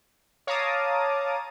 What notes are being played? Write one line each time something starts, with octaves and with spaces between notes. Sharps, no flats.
C#5 F5 A5 A#5 D6 D#6